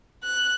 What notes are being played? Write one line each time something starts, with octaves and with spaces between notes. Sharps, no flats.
F#6